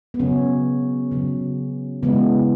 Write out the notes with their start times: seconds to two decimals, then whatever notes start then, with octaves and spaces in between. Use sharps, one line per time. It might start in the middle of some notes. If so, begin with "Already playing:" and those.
0.14 B3
0.19 C#3 F#3 C#4
1.11 C#3 F#3
2.03 C#3 E3 G#3 B3